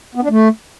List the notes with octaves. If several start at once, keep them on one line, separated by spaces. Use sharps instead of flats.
B3
D4
A3